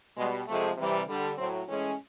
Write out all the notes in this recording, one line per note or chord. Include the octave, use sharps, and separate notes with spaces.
B2 G3 G#3
C3 F3 G#3 A3
C3 E3 G3
D3 G3
A2 F#3 C4
A2 E3 G#3 C#4